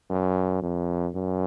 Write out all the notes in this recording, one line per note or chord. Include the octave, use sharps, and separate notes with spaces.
F#2
F2
F#2